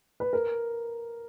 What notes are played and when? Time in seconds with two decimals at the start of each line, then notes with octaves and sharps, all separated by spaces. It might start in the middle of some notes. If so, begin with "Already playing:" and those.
0.20 B4
0.33 A#4